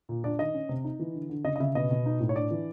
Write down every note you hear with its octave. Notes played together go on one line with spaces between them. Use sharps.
A#2
D4 D5
D#3 D#5
C#4
C3
D#4
E3
D3
D3
C#3 D#5
D#5
C#3 E5
B2 D#5
B2
D#4
A2
C#5
D4 D5
E3